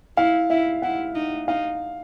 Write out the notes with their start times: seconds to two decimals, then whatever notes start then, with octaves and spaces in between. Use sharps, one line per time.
0.17 E4 F5
0.50 E4 E5
0.82 E4 F#5
1.15 D#4
1.48 D#4 F5